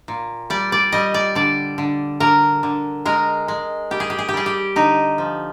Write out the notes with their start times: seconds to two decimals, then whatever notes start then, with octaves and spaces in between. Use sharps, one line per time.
0.08 A#2
0.50 G3 D5
0.72 D5
0.92 G3 D#5
1.14 D5
1.35 D3 D5
1.78 D3
2.20 D3 A#4
2.63 D3
3.05 G#3 A#4
3.48 G#3
3.91 G3 G4
4.00 G#4
4.10 G4
4.19 G#4
4.29 G4
4.34 G3 G#4
4.46 G4
4.76 D3 D#4
5.18 F3